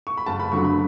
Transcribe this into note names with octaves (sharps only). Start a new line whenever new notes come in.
C#6
B5
F#1 A5
B5
F#2 D3 F#3 A3 C#6
B5